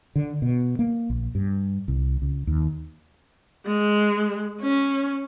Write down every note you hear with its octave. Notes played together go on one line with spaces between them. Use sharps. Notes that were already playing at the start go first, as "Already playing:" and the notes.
D3
B2
A#3
A#1
G2
C2
C#2
D#2
G#3
C#4